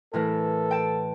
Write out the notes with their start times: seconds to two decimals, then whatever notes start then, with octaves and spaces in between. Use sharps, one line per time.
0.13 A2 E3 A4 A#4
0.71 G5 A5